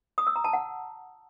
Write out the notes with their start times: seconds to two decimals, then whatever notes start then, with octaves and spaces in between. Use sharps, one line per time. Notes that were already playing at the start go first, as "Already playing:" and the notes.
0.18 D#6
0.27 E6
0.36 A#5
0.44 A5
0.53 F#5